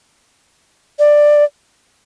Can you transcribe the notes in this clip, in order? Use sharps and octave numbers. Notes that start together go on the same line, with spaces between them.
D5